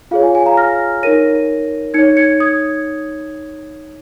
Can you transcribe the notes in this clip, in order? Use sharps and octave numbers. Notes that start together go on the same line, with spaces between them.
F4 G#4 C#5 F5
G#5
G#5
F5 A#5
F6 A#6
D#4 A#4 C#5 A#6 D#7
D#4 C#5 G#6 C#7
G#6 C#7
D#6 G#6